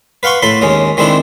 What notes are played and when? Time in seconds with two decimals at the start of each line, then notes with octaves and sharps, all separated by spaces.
0.23 B4 F5 F#5 C6 C#6
0.42 A2 A4 B5 C6
0.61 D#2 G#3 C#4
0.97 D#3 G#3 C4 D4 E4 A4